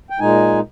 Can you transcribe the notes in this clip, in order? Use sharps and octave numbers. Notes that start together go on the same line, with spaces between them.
G5
A#2 G#3 D#4 G#5